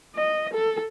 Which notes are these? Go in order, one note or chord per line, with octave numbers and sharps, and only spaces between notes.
D#5
A4